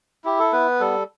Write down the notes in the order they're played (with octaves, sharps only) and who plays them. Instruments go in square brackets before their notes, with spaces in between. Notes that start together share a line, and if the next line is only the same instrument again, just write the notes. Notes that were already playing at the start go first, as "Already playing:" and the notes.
[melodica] E4 G4
A4
B3 B4
G3 A4